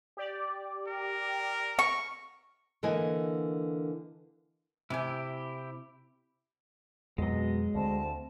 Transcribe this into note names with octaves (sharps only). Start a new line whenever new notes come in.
G4 D5
A#4
C#6
D3 E3 A#3 B3 D#5 G#5
C3 E4 G4 G#5
F2 B2 F#3 G#3 D#5
D2 C4 A5